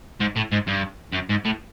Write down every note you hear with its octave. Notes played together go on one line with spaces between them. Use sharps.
G#2
A2
G#2
G2
F#2
G#2
A2